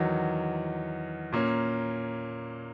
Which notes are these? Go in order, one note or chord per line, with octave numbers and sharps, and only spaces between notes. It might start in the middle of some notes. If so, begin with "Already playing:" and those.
Already playing: E2 D#3 F#3
A#2 A#3 C#4